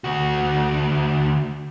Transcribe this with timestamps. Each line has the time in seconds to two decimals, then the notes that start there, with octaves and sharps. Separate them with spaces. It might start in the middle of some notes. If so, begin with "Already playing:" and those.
0.04 D2 F#4